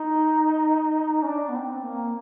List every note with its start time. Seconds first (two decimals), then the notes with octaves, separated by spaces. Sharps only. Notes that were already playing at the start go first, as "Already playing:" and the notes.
Already playing: D#4
1.22 C#4
1.27 D4
1.48 B3
1.55 C4
1.83 A#3